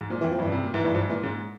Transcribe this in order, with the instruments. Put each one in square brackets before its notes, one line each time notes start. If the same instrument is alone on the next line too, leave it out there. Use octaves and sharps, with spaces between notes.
[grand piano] G#2
[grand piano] A#2 [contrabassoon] F3
[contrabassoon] E3
[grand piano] F2
[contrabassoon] F3
[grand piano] G2 [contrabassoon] E3
[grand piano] C#3
C3
A#2
[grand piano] G#2 [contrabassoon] E3
[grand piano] G2 [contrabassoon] E3
[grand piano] G#2 [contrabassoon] F3
[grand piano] A#2 [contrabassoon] E3
[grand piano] G#2 [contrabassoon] C#3